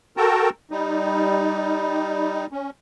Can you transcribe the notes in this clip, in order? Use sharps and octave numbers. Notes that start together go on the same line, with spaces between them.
F#4 A4 A#4 G5 A5 A#5
G3 D#4
C#4